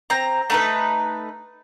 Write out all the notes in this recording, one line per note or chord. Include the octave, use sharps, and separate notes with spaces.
C4 A#5
A3 D#4 B4